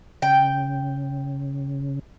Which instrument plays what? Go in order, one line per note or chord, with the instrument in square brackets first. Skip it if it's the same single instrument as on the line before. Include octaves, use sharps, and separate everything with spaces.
[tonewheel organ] C#3 [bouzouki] G5